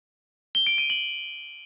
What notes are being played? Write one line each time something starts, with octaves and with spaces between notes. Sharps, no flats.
G7
D7
D#7
F#7